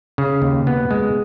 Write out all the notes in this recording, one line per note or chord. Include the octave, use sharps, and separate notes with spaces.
C#3
D#2
B3
G#3